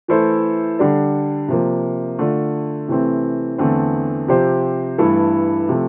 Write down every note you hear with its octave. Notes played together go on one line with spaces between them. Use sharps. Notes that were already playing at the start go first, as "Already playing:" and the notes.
E3 A3 E4 A4 C5
D3 G3 D4 A4
C3 F3 A#3
D3 A3 D4 F4
C3 E3 A3 C4
E2 D3 A3 C4
C3 F3 C4 G4 C5
G2 E3 A3 E4 A4
C3 F3 A3